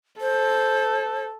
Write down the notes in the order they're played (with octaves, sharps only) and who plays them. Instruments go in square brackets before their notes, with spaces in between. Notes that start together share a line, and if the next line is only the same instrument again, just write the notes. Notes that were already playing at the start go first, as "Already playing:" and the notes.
[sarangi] A4 [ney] C5